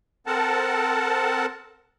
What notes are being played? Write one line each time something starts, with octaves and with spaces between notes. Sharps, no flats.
C4 A4 A#4 F#5 A5